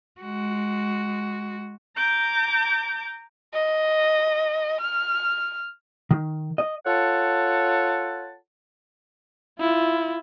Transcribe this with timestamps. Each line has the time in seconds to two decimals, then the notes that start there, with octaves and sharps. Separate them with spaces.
0.21 G#3 F#4
1.96 A#5 D6 G6
3.53 D#5
4.81 F6
6.11 D#3
6.58 D#5
6.86 F4 A4 C#5 F#5 A5
9.60 E4 F4